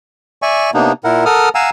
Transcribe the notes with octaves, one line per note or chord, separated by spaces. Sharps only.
D5 E5 G#5 C#6
C3 A#3 B3 D4 D#4
A#2 E4 A#4 F#5
A4 A#4 F#5 D#6 F6
F5 F#5 G#5 A#5 E6